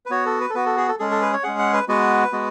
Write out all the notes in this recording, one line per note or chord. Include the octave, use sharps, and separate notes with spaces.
B4
B3 F#4 C#5
A4
B4
A4
B3 F#4 B4
A4
G#4
A4
G#3 C#4 G#4 A4
A4
B4
C#5
G#3 C#4 G#4 F#5
F#5
B4
G#3 B3 F#4 B4
G#3 B3 F#4